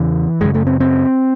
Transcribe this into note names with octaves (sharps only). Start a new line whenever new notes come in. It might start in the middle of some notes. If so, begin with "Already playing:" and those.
Already playing: E2 C#3 E3
F#2 C#3 G#3
A3
C4
C4